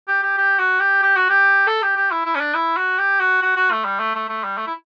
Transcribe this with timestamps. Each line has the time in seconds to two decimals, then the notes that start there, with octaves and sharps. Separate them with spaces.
0.08 G4
0.23 G4
0.38 G4
0.59 F#4
0.80 G4
1.03 G4
1.16 F#4
1.30 G4
1.67 A4
1.83 G4
1.96 G4
2.12 E4
2.26 E4
2.35 C#4
2.40 D4
2.54 E4
2.77 F#4
2.98 G4
3.20 F#4
3.43 F#4
3.57 F#4
3.72 A3
3.85 G3
4.00 A3
4.15 A3
4.29 A3
4.44 G3
4.58 A3
4.67 E4